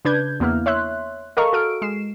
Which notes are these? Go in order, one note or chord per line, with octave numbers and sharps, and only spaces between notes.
C#3 D4 B4 G6 G#6
E2 A#3 B3 E4 F6
C#5 E5 C6 F#6
A4 A#4 D#5 F5 A#5 C#6
F#4 A4 F6 D7
G#3 C7 E7